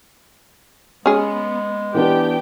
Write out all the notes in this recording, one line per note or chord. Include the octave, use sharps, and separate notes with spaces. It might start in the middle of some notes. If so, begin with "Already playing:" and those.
G#3 B3 C#4 G#4
E3 B3 D4 G4 G5